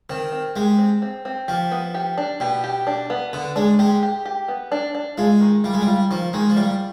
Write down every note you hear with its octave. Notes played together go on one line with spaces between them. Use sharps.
D#3 C4
C4
G#3 G4
C4
C4
C4
F3 G4
B3
G4
D4
B2 G4
G4
D4
B3
D3 B3
G#3 D4
G#3 G4
G4
G4
B3
D4
D4
G#3 F4
D#3
G3 F4
G#3
G3
F4
D#3 F3
D#3 G#3
F3
G3 F4